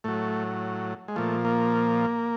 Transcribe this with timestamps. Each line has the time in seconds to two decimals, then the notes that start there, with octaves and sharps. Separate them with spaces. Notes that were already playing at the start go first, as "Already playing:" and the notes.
0.04 A2 F#3 A3
1.08 G#3
1.16 A#2 F3 A3
1.45 A#3